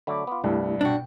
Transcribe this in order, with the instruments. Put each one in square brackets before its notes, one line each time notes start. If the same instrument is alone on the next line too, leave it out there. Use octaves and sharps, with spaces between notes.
[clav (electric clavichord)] D3 F#3 A3 [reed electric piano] B5 D6
[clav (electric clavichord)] B3 F4
[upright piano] C2 G2 [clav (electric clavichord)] G3 [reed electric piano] A3 E4 G4
[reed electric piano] B2 G5 [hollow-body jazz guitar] D4 F#4